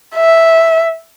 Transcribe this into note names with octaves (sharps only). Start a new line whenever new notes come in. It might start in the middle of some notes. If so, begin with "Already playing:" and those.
E5